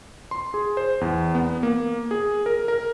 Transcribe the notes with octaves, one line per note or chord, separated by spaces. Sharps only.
C6
G#4
C5
E2
B3
A#3
G#4
A#4
A#4